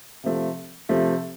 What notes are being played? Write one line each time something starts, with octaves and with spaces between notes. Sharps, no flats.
C3 F3 A3
C3 F3 A3